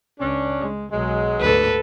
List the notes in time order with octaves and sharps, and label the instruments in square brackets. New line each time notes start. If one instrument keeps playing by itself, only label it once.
[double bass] C#2 [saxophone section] C#4 D4
[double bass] G#3
[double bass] B1 [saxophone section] F#3 G#3
[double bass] D2 G#2 [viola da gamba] A4 B4